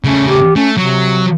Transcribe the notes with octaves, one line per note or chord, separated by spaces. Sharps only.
C#3 A3 C#4
G4
A3 C#4
C3 F#3